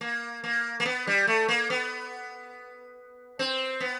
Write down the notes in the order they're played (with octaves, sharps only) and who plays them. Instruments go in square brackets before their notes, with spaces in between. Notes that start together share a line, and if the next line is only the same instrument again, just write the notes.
[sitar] A#3
A#3
A#3
B3
G3
A3
A#3
B3
C4
B3